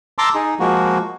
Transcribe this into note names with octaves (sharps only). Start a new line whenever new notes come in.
A5 A#5 C6 D6 E6
D#4 G#4
F3 G#3 A#3 F#4